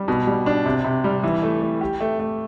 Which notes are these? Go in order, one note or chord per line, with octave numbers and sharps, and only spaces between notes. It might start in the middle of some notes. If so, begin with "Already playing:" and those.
Already playing: G3
B2
G3
D4
C3
C3
G3
E3
A3
A3
G4
A3
A3